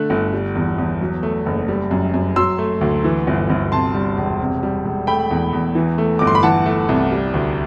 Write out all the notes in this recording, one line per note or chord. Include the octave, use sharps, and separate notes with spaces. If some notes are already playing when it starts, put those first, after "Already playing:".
Already playing: D3 A3 F#6
G1
G3
E2
E2
F#3
A3
F#1
G3
F#2
F#2
F#3 C6 E6
A3
D2
E3
G1
G1
C3 A5 C6
G3
E1
C3
G3
E1
A3 G5 B5
E2
E2
E3
A3
G1 D6
C6
B5
E3 F#5 A5
A3
C2
G3
D2